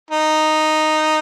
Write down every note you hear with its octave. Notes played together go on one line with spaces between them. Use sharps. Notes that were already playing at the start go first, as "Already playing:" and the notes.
D#4